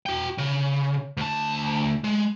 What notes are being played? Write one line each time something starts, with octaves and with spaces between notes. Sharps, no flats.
F#4 G5
C#3
D2 A5
G#3